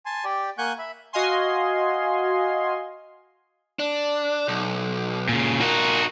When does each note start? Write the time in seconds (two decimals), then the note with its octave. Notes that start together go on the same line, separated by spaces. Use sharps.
0.06 G#5 A5 C6
0.25 G4 D5 G5
0.58 A#3 F#5 G#5 C#6 F#6 G6
0.79 E5 B5
1.13 F#4 D#5 F5 G#5 C6
3.79 D4
4.48 B1
5.29 A#2 C#3
5.61 D#4 F4 F#4 A#4